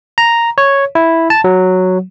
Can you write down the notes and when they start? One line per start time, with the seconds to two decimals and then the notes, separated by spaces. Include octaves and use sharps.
0.18 A#5
0.58 C#5
0.95 E4
1.30 A5
1.44 F#3